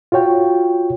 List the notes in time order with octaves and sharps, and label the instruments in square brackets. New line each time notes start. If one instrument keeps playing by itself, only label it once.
[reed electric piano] F4 F#4 C#5 G5